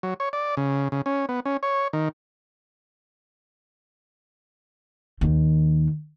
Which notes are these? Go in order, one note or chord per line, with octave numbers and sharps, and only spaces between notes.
F#3
C#5
D5
C#3
C#3
C#4
B3
C#4
C#5
D#3
D#2 D#3